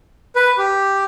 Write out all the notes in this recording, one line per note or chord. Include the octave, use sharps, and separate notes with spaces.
B4
G4